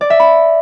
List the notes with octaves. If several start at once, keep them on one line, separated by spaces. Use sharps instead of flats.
D5
E5
B5